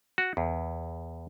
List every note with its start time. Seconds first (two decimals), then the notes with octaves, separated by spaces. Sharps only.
0.18 F#4
0.37 E2